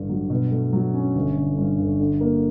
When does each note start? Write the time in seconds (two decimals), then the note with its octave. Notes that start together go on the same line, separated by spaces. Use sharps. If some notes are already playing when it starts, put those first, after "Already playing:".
Already playing: A1 G2 D3
0.09 F#3
0.30 B2
0.51 A3
0.73 F#3
0.94 C#4
1.15 G1
1.36 D3
1.58 G2
1.79 G1
2.00 D3
2.21 A#3